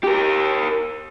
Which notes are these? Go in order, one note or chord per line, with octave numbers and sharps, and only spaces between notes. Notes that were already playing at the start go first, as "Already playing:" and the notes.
G4 A#4